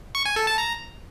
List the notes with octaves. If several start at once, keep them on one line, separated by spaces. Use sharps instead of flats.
C#6
G#5
A4
A5
A#5